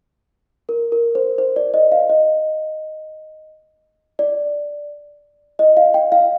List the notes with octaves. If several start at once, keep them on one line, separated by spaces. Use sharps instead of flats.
A#4
A#4
C5
C5
D5
D#5
F5
D#5
D5
D#5
F5
G5
F5